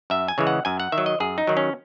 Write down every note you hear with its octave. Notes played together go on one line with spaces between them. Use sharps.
F#2 E5
G#5
C#3 E3 G#3
F#5
F#2 G#5
F#5
D#3 E5
F#3
D#5
F#2 G#4
D#4
D#3 F#3
C#4